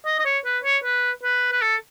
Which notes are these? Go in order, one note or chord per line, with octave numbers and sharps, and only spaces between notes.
D#5
D#5
C#5
B4
C#5
B4
B4
B4
A4